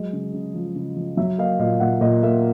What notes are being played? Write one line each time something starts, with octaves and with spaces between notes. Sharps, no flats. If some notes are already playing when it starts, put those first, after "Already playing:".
Already playing: F#3 G#3 D#5
C#3
C#3
F3
C#3
F3
F#3 E5
A#3 D#5 F5
A#2 D#5 F5
A#2 E5 F#5
A#2 D#5
A#3 E5